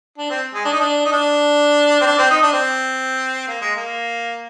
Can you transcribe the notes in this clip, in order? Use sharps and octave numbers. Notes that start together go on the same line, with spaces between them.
D4
C4
G#3
D4
D#4
D4
D#4
D4
C4
D4
C4
D#4
D4
C4
A#3
G#3
A#3